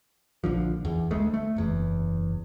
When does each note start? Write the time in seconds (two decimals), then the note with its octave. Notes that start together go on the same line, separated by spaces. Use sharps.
0.44 A#1 D3 F3
0.85 E2
1.11 D2 G#3 A3
1.34 A3
1.56 F#1 E2